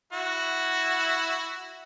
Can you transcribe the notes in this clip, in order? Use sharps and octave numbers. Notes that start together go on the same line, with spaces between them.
E4 F#4